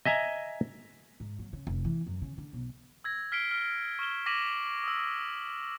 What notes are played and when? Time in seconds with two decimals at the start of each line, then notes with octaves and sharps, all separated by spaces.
0.05 D#5 E5 G#5 A#5
1.20 G#2
1.39 F#3
1.53 C#3
1.67 F1
1.85 E3
2.06 F#2
2.22 C#3
2.38 D3
2.53 B1
3.04 E6 G#6 A#6
3.32 F6 B6 C7 D7 G7
3.51 F6
3.99 C#6 F6 E7 G7
4.26 D6 A#6 B6 D#7 E7 F#7
4.84 D#6 E6